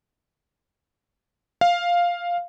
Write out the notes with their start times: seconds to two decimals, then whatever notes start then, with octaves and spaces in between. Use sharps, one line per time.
1.61 F5